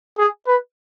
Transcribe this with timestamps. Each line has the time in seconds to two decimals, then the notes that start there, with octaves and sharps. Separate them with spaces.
0.18 G#4
0.47 B4